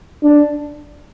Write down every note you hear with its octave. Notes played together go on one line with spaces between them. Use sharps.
D4